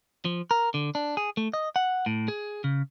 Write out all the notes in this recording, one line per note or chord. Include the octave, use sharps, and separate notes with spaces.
F3
A#4
D3
D4
G#4
A3
D#5
F#5
A2
G#4
C#3